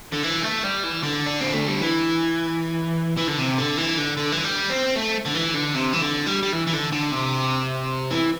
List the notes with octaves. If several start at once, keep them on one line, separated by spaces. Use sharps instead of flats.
D3
E3
A3
G3
E3
D3
D4
C4
A3
G3
E3
E3
D3
C3
D3
E3
D3
D3
E3
G3
C4
A3
D3
E3
D3
C3
E3
D3
G3
G3
E3
E3
D3
D3
C3
E3